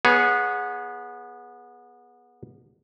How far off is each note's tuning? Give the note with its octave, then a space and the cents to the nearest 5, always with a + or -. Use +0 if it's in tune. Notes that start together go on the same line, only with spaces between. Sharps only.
B3 -20 G#4 +0 C#5 +0